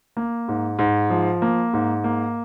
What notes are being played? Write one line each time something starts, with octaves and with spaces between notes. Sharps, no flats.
A#3
G#2
G#2
F3
A#3
G#2
A#3